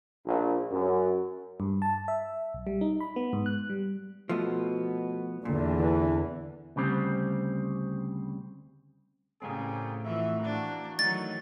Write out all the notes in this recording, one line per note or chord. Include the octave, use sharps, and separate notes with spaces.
A#1
F#2
G2
A5
E5
B1
G3
D#4
B5
B3
G#2
F#6
G3
B2 F3 A3 B3
E2 A#2 D3
E3
D2 C#3 G3 C4
A2 C#3 G3 A3 A#3 C4 G#4
E3 F3 F#4 E5
E3 A#3 D4 F#4
D#3 E3 F#3 A3 D#4 A6